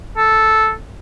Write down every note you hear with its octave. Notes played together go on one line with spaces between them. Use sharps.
A4